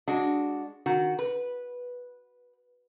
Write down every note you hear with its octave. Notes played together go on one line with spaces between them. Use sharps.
G#3 D4 F#4
D#3 F#4
B4